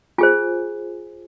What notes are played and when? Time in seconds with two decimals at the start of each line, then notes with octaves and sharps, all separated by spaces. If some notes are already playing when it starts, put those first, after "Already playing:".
0.18 F4 G#4 C5 G#5